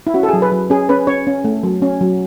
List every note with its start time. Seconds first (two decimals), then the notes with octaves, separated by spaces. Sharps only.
0.07 E4
0.14 C#4 F#4
0.23 A4
0.29 G#4
0.33 F#3
0.42 B4
0.52 F#3
0.70 C#4 G#4
0.89 C#4 B4
1.07 C#4 C#5
1.27 C#4
1.44 A3
1.63 F#3
1.82 C#4
2.01 F#3